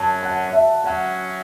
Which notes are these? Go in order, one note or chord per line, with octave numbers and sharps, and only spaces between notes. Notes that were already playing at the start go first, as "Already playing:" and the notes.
Already playing: F#2 F#3 C#4 A5
F#5
E5
F#3 C#4 F#4 F#5